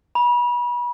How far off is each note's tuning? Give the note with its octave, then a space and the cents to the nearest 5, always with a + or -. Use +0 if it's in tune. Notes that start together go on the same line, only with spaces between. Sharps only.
B5 -30